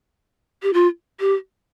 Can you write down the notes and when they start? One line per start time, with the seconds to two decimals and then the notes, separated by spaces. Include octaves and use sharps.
0.63 G4
0.74 F4
1.20 G4